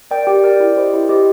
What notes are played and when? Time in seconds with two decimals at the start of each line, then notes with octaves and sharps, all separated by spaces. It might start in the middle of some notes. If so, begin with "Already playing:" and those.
0.11 A#4 D5 G5
0.27 G4
0.44 A#4 D5 G5
0.60 E4
0.76 G4 C5 D#5
0.93 E4
1.09 G4 C5 D#5